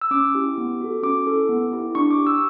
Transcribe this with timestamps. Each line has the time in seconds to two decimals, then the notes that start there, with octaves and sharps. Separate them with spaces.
0.01 E6
0.11 C#4 D6
0.35 E4 G4
0.58 B3
0.81 F#4 A4
1.03 C#4 D6
1.26 E4 A4
1.49 B3
1.72 E4 G4
1.95 D4 C#6
2.11 D6
2.18 G4
2.27 E6